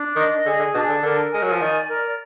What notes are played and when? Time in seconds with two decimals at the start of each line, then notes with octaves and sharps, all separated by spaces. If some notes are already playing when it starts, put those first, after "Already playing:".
Already playing: D4
0.16 D#3 D#5
0.45 D3 G#4
0.59 D3
0.74 B2 D4
0.89 D3
1.03 D3 A#4
1.32 G#3 G#5
1.42 F#3
1.52 F3
1.60 D#3 D5
1.89 A#4